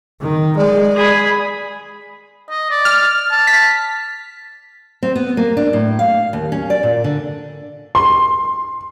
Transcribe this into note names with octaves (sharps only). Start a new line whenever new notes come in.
D#3
G#3 D5
G#4 B5
D#5
D5
F6
A5
B6
C4
B3
A#3
D4
A2
F5
D#2
C#4
D5
A#2
D3
C6